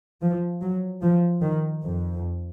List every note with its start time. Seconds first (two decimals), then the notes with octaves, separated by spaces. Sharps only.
0.22 F3
0.62 F#3
1.02 F3
1.42 D#3
1.83 F2